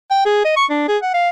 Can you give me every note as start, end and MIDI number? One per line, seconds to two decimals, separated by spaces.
0.11 0.21 79
0.26 0.41 68
0.45 0.55 75
0.57 0.65 85
0.70 0.87 62
0.88 0.97 68
1.02 1.13 78
1.14 1.30 77